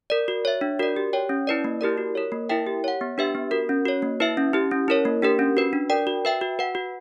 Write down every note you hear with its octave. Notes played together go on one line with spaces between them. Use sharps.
A#4 D5
F#4
C#5 E5
D4
F#4 A#4 D5
G4
C#5 G5
C#4
E4 B4 D5
A#3
E4 G4 A#4 D5
F#4
A#4 C#5
A#3
E4 A#4 E5 G5
G4
C#5 F#5
B3
D4 G4 B4 E5
B3
F#4 A#4
C#4
F#4 C#5
A#3
E4 B4 E5
C#4
E4 G4
C#4
E4 A#4 C#5
A#3
D4 G4 A#4
C#4
F#4 B4
D4
A#4 D5 G5
F#4
B4 E5 G5
F#4
B4 F#5
F#4